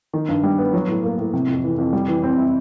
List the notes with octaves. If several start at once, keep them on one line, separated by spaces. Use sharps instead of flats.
D#3
G2
G3
B3
F#3
A2
A#3
A2
C3
F2
E3
F2
G3
E3
C4
E4